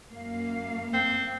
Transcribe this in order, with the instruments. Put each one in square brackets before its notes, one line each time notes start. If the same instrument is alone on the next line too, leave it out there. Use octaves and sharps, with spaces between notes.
[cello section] F#2 A#3 F5
[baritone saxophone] C4